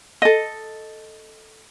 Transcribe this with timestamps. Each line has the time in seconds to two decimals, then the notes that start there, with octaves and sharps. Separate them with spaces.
0.22 A4 D#5